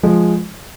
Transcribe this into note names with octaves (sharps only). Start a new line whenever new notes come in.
F3 G#3